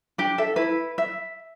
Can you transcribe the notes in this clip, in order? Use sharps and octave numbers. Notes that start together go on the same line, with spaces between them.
D4 G4
A4 E5
E4 B4
E5